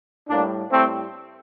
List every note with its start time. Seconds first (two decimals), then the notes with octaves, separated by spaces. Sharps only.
0.29 A2 G3 A#3 D4
0.71 A2 G3 A3 C4